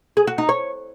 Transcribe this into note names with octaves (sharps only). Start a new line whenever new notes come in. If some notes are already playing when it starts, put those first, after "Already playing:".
G#4
F#4
D#4
C#5